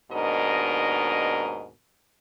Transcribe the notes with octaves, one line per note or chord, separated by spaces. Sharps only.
D#2 G#2 B2 D4 A#4 D#5